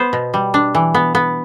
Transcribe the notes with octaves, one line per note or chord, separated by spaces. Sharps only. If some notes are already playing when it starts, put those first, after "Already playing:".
Already playing: B3 C5
B2
G3
D4
E3
B3
B3